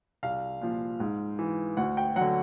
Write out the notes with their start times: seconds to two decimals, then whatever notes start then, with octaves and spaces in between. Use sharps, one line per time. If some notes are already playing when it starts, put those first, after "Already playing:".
0.23 C2 F5
0.61 A#2 F3
1.00 G#2
1.39 E3
1.77 D2 F#5
1.97 G5
2.16 D3 F#3 F#5